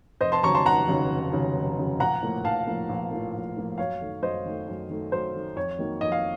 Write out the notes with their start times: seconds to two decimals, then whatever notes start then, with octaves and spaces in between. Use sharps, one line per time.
0.21 F1 C5 D#5
0.32 A5 C6
0.43 D#2 C#3 F#3 A#5 C#6
0.55 A5 C6
0.66 F1 F#5 A#5
0.88 D#2 C#3 F#3
1.10 F1
1.33 D#2 C#3 F#3
1.55 F1
1.78 D#2 C#3 F#3
1.99 A#1 F#5 A#5
2.23 A2 F3 A#3
2.44 A#1 F5 A5
2.67 A2 F3 A#3
2.89 A#1
3.11 A2 F3 A#3
3.34 A#1
3.56 A2 F3 A#3
3.78 F#2 C#5 F5
4.01 D#3 A3
4.22 F#2 C5 D#5
4.45 D#3 A3
4.68 F#2
4.89 D#3 A3
5.12 F#2 C5
5.35 D#3 A3
5.56 F2 C#5
5.79 D#3 F#3 A#3
6.01 F2 D#5
6.12 F5